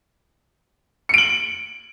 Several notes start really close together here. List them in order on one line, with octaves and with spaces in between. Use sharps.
C#7 D7 F#7